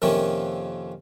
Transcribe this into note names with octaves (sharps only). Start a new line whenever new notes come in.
F2 C3 D#3 F3 A#3 C#4